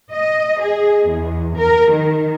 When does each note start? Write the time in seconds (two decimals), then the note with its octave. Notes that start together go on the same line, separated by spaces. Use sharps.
0.11 D#5
0.62 G#4
1.08 E2
1.56 A#4
1.92 D#3